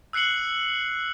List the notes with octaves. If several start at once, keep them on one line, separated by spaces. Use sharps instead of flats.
E6 F#6 C7 C#7 F#7